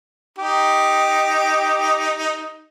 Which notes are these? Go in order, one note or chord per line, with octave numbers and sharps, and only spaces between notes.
D#4 G4